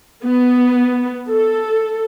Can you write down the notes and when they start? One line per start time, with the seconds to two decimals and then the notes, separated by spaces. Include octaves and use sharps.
0.24 B3
1.29 A4